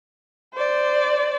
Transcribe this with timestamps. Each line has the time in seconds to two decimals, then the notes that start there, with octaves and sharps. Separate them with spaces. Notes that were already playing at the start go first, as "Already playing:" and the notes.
0.54 C5 D5